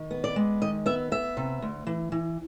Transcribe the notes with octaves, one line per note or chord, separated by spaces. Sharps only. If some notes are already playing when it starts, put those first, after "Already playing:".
Already playing: D#3
B3
D5
G#3
D#3 D#5
B3 E5
B3 E5
C3
D2
E3
E3